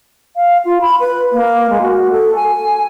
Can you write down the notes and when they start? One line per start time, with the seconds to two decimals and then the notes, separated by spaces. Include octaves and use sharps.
0.36 F5
0.65 F4
0.81 B5
1.00 B4
1.33 A#3
1.70 G#3
1.81 F#4
2.11 A4
2.35 G#5